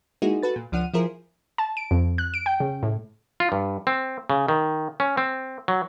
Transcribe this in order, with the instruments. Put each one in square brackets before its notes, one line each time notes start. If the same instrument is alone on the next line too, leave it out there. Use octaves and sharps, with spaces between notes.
[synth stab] G#3 A#3 D#4 E4 F#4 G#4
F#4 A4 B4 A6
A#2
C#2 F3 D4 F#5 F6 D#7
F3 E4 F4 G#4 A#4 C5
[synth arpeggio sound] A5
D7
F2
F#6
D7
G5
C#3
A2
[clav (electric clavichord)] F4
G2
C4
C#3
D#3
C#4
C4
F#3